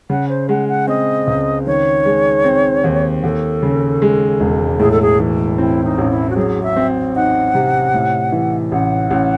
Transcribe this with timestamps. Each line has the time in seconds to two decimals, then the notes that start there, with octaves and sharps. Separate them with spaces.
0.10 C#3 F#5
0.29 C5
0.49 G#3 F#5
0.69 F#5
0.88 C4 D#5
1.27 C#2
1.67 D#3 C#5
2.06 G#3
2.44 C4
2.84 D#2
3.23 D#2 A4
3.63 C#3
4.02 G#3
4.40 E1
4.79 A2 G#4
4.91 A4
5.02 G#4
5.19 E3
5.58 C4 E4
5.84 D#4
5.98 A1
6.11 E4
6.30 F#4
6.36 F#3 G#4
6.63 E5
6.76 C4
7.16 D#4 F#5
7.55 C3
7.94 A2
8.32 E3
8.72 A1 F#5
9.11 A1